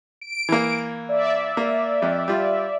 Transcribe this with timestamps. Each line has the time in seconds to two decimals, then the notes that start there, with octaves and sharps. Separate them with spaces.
0.21 D7
0.49 E3 A#3
1.09 D5 E5
1.57 A#3
2.02 F2
2.28 G3 F4